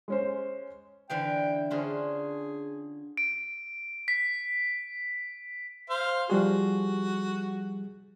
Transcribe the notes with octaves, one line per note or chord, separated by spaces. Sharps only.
G#3 C#4 C5
D3 E3 F5 G5
D3 C#4 F4 G#4
D7
B6
C5 F5
F3 G3 F#4 G#4